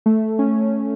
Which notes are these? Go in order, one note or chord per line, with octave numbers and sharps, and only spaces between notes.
A3
C#4